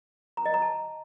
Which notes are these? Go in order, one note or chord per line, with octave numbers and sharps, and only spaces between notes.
A#5
D#5
A#5
A5